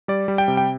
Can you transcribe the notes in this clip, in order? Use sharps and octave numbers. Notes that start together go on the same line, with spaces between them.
G3 D5
G3
G5
C3
G5